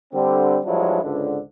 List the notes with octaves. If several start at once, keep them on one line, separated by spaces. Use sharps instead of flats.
D3 G3 C4
G2 F3 F#3 G#3 D4 E4
C#2 G#2 D3